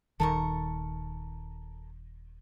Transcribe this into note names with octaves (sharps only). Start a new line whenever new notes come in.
D#1 D#3 A4 A#4 C#6